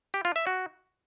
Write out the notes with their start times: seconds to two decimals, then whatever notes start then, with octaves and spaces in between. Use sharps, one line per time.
0.14 G4
0.25 F4
0.36 E5
0.47 F#4